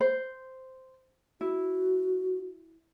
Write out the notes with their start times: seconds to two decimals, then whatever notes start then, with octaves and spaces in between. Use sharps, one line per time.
0.01 C5
1.41 E4 F#4